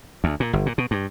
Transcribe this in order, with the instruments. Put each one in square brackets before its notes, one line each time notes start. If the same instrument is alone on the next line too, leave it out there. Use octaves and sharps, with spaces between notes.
[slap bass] D2
A#2
G1
A#2
B2
G2